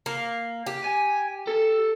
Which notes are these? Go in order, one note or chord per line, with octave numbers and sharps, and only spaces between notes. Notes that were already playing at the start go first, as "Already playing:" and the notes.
A#3
G4
G#5
A4